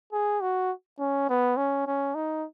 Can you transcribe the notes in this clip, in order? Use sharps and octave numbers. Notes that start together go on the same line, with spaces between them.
G#4
F#4
C#4
B3
C#4
C#4
D#4